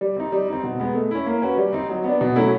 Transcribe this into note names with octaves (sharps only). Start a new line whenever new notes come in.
G3
C4 D#4
G3
C4 D#4
B2
G#3 B3
A3
C#4 E4
A#3
C#4 F#4 B4
G3
C4 D#4
F#3
B3 D4
B2
F#3 A3 C#4 E4